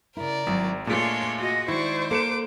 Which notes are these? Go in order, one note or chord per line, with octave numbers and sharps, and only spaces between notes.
C#3 E4 A#4 D5
G#1 F#3 E4
A#2 G#3 A3 D4 F4 G#4 C#5 A5
F#4 D#5
D#3 G#3 E4 C5 D5 C#6
A#3 A4 D6 C#7 E7